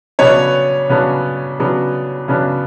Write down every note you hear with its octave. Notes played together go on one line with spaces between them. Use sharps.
C#3 F#3 B3 D4 C#5
C#3 F#3 B3 D4
C#3 F#3 B3 D4
C#3 F#3 B3 D4